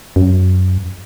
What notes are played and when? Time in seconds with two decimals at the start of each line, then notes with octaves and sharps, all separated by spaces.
0.16 F#2